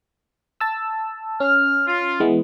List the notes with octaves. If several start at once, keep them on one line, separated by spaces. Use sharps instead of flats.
A5 E6
C#4 F6
F4
E3 G#3 B3